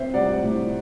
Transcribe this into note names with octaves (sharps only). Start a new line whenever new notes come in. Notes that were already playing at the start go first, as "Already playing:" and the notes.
Already playing: C4 C5 E5
G3 D5 F#5
A2